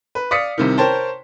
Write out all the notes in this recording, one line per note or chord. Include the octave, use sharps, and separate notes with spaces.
B4
D5 F5 D#6 B6 C#7
C2 C3 D#3
A#4 C5 C#5 G5 A5 C6